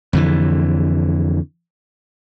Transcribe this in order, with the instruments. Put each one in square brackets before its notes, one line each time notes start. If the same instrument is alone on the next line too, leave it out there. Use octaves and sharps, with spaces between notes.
[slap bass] F2 D3 E3